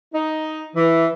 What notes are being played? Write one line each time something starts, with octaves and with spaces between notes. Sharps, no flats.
D#4
E3